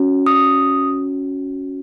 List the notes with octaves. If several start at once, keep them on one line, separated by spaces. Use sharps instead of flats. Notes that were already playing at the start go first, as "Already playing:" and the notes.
Already playing: C#4 F#4
D#6